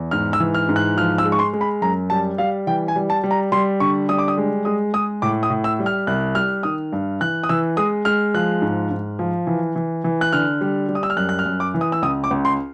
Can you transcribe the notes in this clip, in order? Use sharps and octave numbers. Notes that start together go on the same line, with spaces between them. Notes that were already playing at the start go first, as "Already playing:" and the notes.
Already playing: E2
G#2 F6
E6
E3
F6
G#2
F#6
F3 F6
E6
G#3
C#6
C6
G#3
B5
F#2 A#5
G3 A5
G3 F5
E3 G5
G#5
G3
A5
G3
A#5
G3 C6
D3 C#6
G3 D#6
D6
D#6
G#3
G#3 D#6
G#3 D#6
A2 D6
D#6
A2
E6
G3
F6
C2 F#6
G3 F6
D#3 D#6
G2
E3 F#6
D#6
E3 E6
G#3 D#6
G#3 F6
F3 F#6
G#2
G#2
F3
E3
E3
E3
F#6
D3 F6
G3
G3
D#6
E6
F6
F#2 F#6
F#6
F6
F#2
D6
E3
D#6
E6
C#2 D#6
D6
C#2
C6